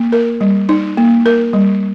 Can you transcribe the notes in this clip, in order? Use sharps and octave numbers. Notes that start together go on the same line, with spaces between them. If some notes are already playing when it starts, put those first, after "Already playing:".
Already playing: A#3
A#4
G3
D#4
A#3
A#4
G3